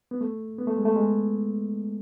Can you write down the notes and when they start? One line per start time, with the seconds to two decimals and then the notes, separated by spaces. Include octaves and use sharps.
0.11 B3
0.21 A3
0.58 B3
0.67 A3
0.77 G#3
0.85 A3
0.96 G#3